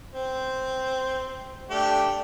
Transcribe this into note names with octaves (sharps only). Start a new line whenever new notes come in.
C4
A3 D4 G4